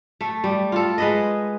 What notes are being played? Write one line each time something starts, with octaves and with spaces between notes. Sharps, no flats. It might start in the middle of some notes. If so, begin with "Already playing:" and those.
A3
G3
F4 A4
G#3 B4 D#5